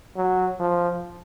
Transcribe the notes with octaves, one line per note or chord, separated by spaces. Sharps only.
F#3
F3